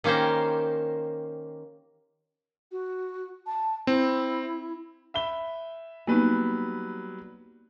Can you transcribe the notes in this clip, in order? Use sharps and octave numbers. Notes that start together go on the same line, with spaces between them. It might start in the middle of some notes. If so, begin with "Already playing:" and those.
D#3 A#3 C#4 G4 C5
F#4
A5
C4 E4
E5 B5 G7
F#3 G3 A#3 B3 D#4 B4